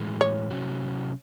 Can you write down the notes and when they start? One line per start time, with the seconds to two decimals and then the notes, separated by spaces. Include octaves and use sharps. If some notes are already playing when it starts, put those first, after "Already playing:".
Already playing: A2 E3 G#3
0.21 C#5
0.51 C3 F#3 C#4 F#4